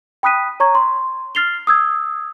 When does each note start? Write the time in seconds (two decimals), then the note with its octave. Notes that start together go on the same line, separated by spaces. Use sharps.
0.23 G5 B5 D#6 F#6 B6 D#7
0.60 C#5 A#5 C#6 G#6
0.75 C6
1.35 F6 A6 C7 F7 G7
1.67 D#6 E6 G#6